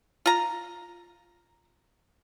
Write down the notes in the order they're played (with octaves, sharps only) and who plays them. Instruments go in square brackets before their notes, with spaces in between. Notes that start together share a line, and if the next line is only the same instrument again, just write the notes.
[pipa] F4 A#5